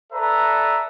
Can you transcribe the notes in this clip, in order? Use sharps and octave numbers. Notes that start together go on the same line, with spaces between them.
A4 B4 D5 E5 A#5